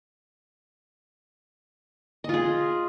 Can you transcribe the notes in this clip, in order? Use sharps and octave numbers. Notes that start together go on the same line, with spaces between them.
F4 G#4 D#5